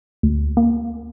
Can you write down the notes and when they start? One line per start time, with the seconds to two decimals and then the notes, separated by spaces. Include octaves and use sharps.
0.23 D2
0.57 A#3